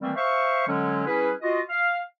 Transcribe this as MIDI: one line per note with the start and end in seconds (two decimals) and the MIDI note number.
0.01 0.11 51
0.01 0.11 52
0.01 0.11 55
0.01 0.11 57
0.01 0.11 58
0.01 0.11 60
0.16 0.64 72
0.16 0.64 76
0.16 0.64 77
0.16 0.64 85
0.67 1.06 50
0.67 1.06 54
0.67 1.06 56
0.67 1.06 61
1.07 1.31 55
1.07 1.31 61
1.07 1.31 64
1.07 1.31 68
1.07 1.31 71
1.42 1.60 65
1.42 1.60 66
1.42 1.60 75
1.69 1.99 77